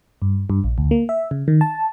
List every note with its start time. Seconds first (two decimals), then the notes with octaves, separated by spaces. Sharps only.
0.22 G2
0.50 G2
0.64 A#1
0.78 D2
0.91 A#3
1.09 E5
1.31 C#3
1.48 D#3
1.61 A5